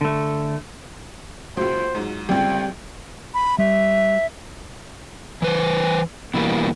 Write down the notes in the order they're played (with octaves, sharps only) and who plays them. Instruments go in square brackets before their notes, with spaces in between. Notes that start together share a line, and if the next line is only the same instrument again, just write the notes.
[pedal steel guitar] D3 A3
[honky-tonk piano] F#1 C#2 [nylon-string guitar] F4 F#4 [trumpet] C5
[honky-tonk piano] G#2 F#3
[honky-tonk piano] G1 C#2 [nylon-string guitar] G3 C4 G4 [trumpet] G5
[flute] B5
[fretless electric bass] G3 [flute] E5
[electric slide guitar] E3 B4 C5
B2 E3 G3 A#3